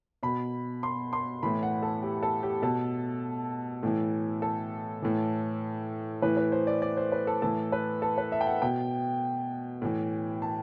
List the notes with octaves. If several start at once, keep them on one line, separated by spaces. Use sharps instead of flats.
B2 B5
C6
C6
A2 E3 B5
F#5
A4
G4
A4
G4
B2 A4
A2 E3
A4
A2 E3
A2 E3 B4
B4
C5
D5
D5
C5
B4
A4
A2 E3 A4
B4
A4
B4
E5
G5
F#5
B2 G5
A2 E3
A5